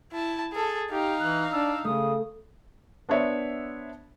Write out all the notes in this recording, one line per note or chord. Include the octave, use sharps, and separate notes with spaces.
E4 A5
G#4 A4
D#4 G4 F5
E3 F#6
D4 E6
C#3 A3 D#6
B3 D4 C5 C#5 E5